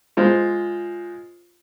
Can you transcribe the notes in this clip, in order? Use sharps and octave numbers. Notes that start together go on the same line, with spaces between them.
G#3 F4 C5